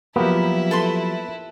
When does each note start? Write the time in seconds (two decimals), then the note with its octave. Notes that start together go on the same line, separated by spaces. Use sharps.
0.16 F3 F#3 A#3 B3 E4 G4
0.71 A4 B4 C6